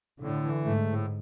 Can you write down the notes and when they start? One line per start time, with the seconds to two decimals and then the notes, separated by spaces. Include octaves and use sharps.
0.20 A2 D3
0.43 E3
0.65 G#2 A3
0.87 A2